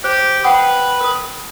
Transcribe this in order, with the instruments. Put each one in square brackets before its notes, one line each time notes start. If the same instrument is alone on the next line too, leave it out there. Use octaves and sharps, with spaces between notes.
[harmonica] G4 [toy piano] C5
[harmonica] B4 [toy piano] F#5 G5 D#6
[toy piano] A#4 D#6